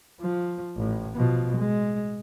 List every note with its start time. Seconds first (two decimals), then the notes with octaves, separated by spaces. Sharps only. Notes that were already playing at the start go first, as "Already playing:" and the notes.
0.21 F3
0.76 A1 A2
1.15 B2 F3
1.56 G#3